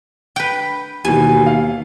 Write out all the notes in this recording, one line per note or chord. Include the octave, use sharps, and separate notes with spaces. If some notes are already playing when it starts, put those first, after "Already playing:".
B4 G5
D#2 B2 E3 G3 G#5
F5